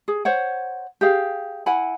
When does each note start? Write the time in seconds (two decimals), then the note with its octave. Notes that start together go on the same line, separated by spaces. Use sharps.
0.08 G#4
0.25 C5 C#5 F#5
1.01 G4 G#4 F5
1.66 E4 F#5 G#5 B5